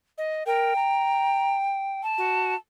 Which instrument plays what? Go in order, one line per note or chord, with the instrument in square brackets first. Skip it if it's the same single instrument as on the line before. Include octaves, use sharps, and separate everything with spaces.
[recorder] D#5
[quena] A#4 [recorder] G5
[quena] A#5
A5
[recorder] F#4